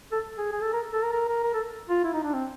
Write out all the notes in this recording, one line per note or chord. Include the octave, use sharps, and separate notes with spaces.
A4
G#4
G#4
A4
A#4
A4
A#4
A#4
A#4
A#4
A4
F4
E4
D#4
D4
C4